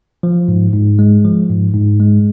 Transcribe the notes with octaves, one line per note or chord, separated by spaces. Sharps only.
F3
G#2
G#2
G#3
F3
G#2
G#2
G#3